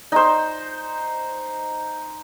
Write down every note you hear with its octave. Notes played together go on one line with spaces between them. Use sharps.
D#4 C5